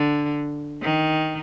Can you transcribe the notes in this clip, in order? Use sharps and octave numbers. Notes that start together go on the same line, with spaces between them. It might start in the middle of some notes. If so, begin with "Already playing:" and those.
Already playing: D3
D#3